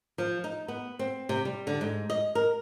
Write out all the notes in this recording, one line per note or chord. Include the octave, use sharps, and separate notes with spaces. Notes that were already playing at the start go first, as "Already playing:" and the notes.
F3
D#4
B3
C4
C3
G3
D3
G#2
D#5
A#4